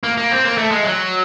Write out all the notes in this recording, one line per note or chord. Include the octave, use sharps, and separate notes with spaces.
A#3
A#3
C4
A#3
A3
G#3
F#3